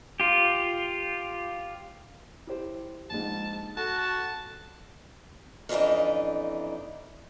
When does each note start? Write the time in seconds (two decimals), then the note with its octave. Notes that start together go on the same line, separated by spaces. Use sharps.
0.20 F4 G4
2.47 E4 G4 C5
3.10 A#1 G#2 A5
3.77 F#4 A4 A5
3.99 A5
5.69 F2 C#3 E3 D4 D#4